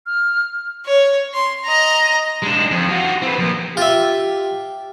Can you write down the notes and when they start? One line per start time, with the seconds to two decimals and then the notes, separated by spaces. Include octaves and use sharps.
0.06 F6
0.86 C#5
1.34 C6
1.64 D#5 A#5
2.42 G#3 D4
2.71 F2
2.89 F4 F#4
3.22 C4 B4
3.39 F3 A#3
3.77 F4 G4 E5